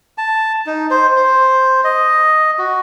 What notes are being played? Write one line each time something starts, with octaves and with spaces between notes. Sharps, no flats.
A5
D#4
C5
C5
D#5
F#4